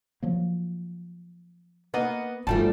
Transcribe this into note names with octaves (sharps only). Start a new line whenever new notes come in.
F3 F#3 A#3
A#3 B3 D#5 F#5
G1 F#2 F3 G3 A3 A5